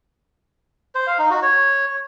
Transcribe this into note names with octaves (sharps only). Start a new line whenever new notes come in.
C5
F5
D#4
F#4
C#5